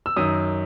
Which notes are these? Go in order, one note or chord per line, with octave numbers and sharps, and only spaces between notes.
E6
F#2 D#3 D#6